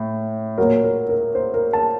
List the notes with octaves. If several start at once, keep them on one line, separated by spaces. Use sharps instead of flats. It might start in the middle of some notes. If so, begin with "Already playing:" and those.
Already playing: A2
A#2 F#3 A#4
A#4
A#4
C5
A#4
A5